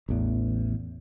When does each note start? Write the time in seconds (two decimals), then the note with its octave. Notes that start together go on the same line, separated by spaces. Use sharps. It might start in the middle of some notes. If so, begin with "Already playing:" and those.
0.09 A1 E2